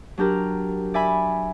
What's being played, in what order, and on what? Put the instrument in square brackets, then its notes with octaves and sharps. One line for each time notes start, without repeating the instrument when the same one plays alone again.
[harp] F#3 D4 G4 A#4
D5 E5 G#5 B5